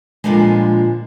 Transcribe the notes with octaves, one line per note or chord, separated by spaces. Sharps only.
A#2 D3 D#3 F3 G3 G#3